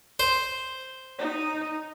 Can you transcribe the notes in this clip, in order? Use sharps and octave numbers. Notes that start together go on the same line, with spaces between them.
C5
D#4